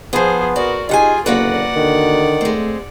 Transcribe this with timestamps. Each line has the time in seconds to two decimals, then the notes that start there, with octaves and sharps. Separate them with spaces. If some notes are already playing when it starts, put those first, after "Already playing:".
0.13 F3 B3 F4 G#4 C5
0.56 F#4 A#4 D5
0.89 D#4 F4 G4 G#4 F#5 G#5
1.26 F#1 D3 A#3 F#4 B4 D5 F#5
1.76 D3 D#3
2.41 G#3 A3 C4